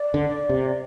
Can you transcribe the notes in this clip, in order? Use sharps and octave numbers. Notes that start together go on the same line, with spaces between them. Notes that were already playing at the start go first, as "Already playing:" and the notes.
Already playing: D5
D3
C3